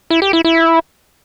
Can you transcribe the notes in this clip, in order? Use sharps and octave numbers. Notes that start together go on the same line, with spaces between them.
E4
G4
E4
E4